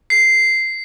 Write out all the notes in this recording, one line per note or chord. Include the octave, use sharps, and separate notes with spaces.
C7